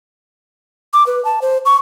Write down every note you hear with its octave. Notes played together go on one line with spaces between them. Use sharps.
D6
B4
A5
C5
C#6